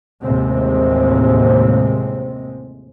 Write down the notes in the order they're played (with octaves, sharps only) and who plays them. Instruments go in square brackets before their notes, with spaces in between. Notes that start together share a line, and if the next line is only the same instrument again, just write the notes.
[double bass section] A1 D#2 A2 C3 G#3 C4